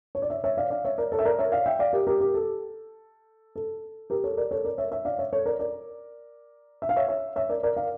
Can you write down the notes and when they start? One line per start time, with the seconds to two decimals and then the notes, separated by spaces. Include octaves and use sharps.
0.15 C#5
0.22 D5
0.30 C#5 E5
0.44 C#5 E5
0.57 D5 F5
0.70 D5 F5
0.85 C#5 E5
0.98 A#4 D5
1.12 A4 C#5
1.19 E5
1.25 A#4 D5
1.39 C#5 E5
1.52 D5 F5
1.66 E5 G5
1.79 D5 F5
1.93 G4 A#4
2.07 G4 A#4
2.21 G4
2.34 A4
3.56 A4
4.10 G4 A#4
4.24 A4 C#5
4.37 A#4 D5
4.51 A4 C#5
4.64 A#4 D5
4.78 C#5 E5
4.91 C#5 E5
5.05 D5 F5
5.19 C#5 E5
5.33 A4 C#5
5.46 A#4 D5
5.59 A#4 D5
6.82 E5
6.89 F5
6.96 C#5 E5
7.08 C#5 E5
7.36 C#5 E5
7.49 A#4 D5
7.63 A#4 D5
7.77 D5 F5